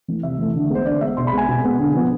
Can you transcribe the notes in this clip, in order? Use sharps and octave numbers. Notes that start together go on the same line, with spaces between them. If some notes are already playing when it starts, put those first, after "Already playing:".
E3 A3
C3 E5
E3 A3
D3
G#3 B3 C5
D3 D5
G#3 B3 E5
B2 C6
B5
G#3 B3 G#5
B2
G#3 B3
D3
F3 B3